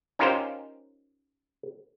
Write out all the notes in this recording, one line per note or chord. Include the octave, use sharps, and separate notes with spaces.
C#4 D#4 F4 G4 A#4 C5